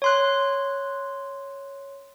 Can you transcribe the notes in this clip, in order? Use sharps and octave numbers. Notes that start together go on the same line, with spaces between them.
C#5 C6 F#6